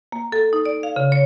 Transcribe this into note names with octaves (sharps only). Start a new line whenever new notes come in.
A#3
A4
D#4
D5
F5
C#3
C#5